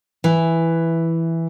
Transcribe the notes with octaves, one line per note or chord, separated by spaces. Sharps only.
E3